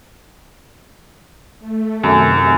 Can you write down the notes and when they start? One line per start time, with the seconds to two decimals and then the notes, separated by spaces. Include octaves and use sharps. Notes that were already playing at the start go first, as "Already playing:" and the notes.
1.59 A3
2.04 F#2 C3 D#3